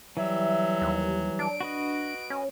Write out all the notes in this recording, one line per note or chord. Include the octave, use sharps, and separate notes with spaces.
E3 F#3 G3 E5
D#2
D4 D7
F#4 B4 D#5
C#4